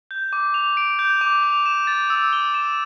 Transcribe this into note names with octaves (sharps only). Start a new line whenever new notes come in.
G6
D6
F7
D7
G6
D6
F7
E7
A6
E6
G7
E7